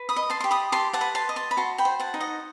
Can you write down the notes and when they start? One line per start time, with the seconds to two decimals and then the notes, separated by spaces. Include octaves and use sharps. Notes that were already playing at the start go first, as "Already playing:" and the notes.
Already playing: B4
0.09 B5 D#6
0.16 D#5
0.30 A5 C6
0.40 G4 C6
0.51 B5 D#6
0.72 G4 A5 C6
0.93 F#5 A5
1.01 B4
1.15 A5 C6
1.29 D#5
1.36 A5 C6
1.51 B5
1.57 F#4 A5 C6
1.78 G5 B5
1.85 C5
2.00 F#5 A5
2.14 D#4
2.20 D#5 F#5